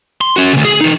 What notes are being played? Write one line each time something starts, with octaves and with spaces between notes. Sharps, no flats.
C6
C#4 F#4
D2 C#3
G#4
E3 D#4